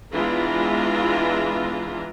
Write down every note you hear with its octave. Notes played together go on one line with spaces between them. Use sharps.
E3 G#3 B3 D4 F4 A#5